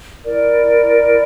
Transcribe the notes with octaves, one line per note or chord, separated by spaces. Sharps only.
E4 A#4 D5